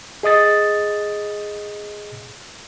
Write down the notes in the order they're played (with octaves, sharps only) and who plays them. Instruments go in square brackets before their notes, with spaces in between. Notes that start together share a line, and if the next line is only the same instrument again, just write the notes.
[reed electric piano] G#4 D#5 D#6 A6